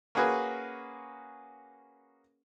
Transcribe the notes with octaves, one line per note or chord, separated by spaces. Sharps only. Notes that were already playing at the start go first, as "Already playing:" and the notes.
A#3 C#4 F#4 G#4 B4